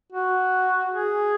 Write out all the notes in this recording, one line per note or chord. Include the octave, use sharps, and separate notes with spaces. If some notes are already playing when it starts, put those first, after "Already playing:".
F#4
G#4